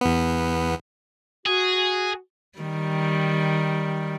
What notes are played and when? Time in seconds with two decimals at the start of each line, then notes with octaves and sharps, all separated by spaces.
0.01 E2 B3
1.46 F#4 G#4
2.59 D#3 G3